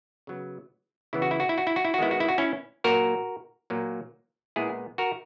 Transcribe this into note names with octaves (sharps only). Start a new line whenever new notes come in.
C#3 F#3 B3
C#3 E3 B3 E4
F#4
E4
F#4
E4
F#4
E4
F#4
E4
F#4
D#3 G#3 B3 E4
F#4
E4
F#4
C#4 E4
A#2 F#3 A#3 F#4 A#4
A#2 F#3 A#3
A#2 G#3 B3 E4 G#4
F#4 A#4